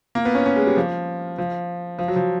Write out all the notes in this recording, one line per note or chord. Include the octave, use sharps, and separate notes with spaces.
A#3
B3
C#4
C#4
G#3
G3
F3
F3
F3
F#3
F3